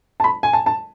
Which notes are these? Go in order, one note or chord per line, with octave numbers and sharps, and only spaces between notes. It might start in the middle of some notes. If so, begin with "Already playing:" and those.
A5
B5
G#5
A5
A5